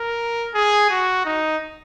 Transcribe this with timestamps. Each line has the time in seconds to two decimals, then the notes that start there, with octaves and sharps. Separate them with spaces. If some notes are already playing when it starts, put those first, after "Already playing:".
Already playing: A#4
0.54 G#4
0.90 F#4
1.25 D#4